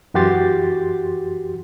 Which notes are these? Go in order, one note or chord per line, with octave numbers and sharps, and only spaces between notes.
F#2 E3 F#4 G4 C6 A6